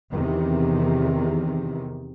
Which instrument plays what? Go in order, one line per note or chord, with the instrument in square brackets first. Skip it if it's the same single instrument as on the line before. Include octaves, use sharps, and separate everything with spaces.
[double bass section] E2 C3 D#3